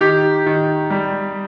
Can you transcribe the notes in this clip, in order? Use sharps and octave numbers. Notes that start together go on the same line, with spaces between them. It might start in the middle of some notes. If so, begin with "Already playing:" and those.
D#3 G4
D#3
G3